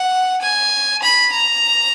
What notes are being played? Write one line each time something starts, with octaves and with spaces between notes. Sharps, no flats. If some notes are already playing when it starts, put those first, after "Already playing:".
Already playing: F#5
G#5
B5
A#5